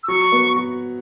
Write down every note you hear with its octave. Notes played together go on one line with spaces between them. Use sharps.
E6
F#3 C#6
B3
F#4